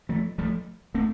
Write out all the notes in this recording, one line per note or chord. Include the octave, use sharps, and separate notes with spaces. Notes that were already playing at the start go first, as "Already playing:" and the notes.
F3 A3
F3 A3
A3 C4